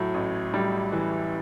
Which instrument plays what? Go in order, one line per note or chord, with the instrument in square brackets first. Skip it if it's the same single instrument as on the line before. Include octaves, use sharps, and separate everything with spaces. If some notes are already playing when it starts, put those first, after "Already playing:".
Already playing: [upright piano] A2 F#3
A1
A2 G3
E3